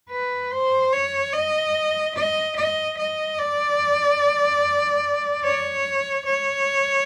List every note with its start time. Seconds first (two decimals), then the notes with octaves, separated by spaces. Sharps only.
0.11 B4
0.51 C5
0.93 C#5
1.33 D#5
2.15 D#5
2.56 D#5
2.98 D#5
3.39 D5
5.44 C#5
6.26 C#5